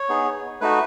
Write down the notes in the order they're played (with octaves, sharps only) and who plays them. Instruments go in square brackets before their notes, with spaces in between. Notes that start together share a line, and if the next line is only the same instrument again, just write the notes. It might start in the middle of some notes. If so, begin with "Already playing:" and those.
Already playing: [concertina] C#5
B3 D#4 G#4
A3 D#4 F#4 B4